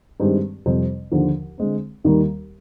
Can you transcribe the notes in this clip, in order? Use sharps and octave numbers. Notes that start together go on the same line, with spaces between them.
G2 D#3 G#3 C4 G4
F2 C3 G3 C4
D#2 D3 F3
D3 G#3 C4
D#2 D#3 G3 A#3